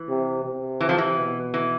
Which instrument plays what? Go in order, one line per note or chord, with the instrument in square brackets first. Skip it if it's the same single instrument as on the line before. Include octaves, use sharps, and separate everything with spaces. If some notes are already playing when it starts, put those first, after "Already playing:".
Already playing: [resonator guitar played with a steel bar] E3
[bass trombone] C3
C3
[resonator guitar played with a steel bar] E3
F3
E3
[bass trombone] B2
[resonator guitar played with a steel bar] E3